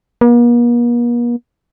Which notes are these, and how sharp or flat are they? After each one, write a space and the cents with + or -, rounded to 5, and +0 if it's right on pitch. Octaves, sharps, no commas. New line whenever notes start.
A#3 +45